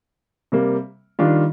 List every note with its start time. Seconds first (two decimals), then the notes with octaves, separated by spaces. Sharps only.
0.52 C3 G3 A#3
1.19 D#3 G3 D4 F4